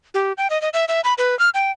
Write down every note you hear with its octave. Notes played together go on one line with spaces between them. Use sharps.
G4
G5
D#5
D#5
E5
E5
B5
B4
F6
G5